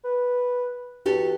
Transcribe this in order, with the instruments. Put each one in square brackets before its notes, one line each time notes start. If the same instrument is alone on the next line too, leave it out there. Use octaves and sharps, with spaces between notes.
[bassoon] B4
[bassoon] E2 [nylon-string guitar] F#4 G4 A4